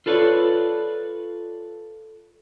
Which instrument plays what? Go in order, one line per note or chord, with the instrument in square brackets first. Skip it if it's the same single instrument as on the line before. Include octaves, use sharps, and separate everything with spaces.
[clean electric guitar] F4 A4 B4 C#5 D5